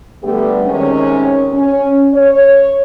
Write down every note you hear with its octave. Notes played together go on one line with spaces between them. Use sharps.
D3 G3 A3 B3 G4
C3 D#3 G#3 C#4
C#4
C#5